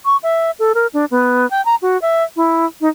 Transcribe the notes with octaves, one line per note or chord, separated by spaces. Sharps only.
C#6
E5
A4
A#4
D4
B3
G5
A#5
F#4
E5
E4
D#4